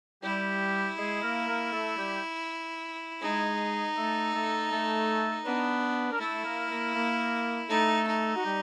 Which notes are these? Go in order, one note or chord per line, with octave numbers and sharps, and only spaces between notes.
G3 E4 G4
G#3 G#4
A#3 A#4
A#3 A#4
A3 A4
G3 G4
G#3 D#4 G#4
A3 A4
A3 A4
A3 A4
B3 D4 B4
A#4
A3 E4 A4
A#3 A#4
A#3 A#4
A#3 A#4
A3 D#4 A4
D#4
F#4
G3 G4